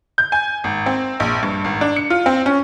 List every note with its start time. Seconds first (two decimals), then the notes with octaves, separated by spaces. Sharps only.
0.18 G6
0.32 G#5
0.64 G#1
0.86 C4
1.20 A#1
1.43 G2
1.65 G#1
1.81 D4
1.96 C#7
2.10 F4
2.26 C4
2.46 C#4